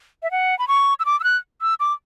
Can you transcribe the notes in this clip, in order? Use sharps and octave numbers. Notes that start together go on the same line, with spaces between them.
E5
F#5
B5
C#6
E6
D6
E6
F#6
E6
D6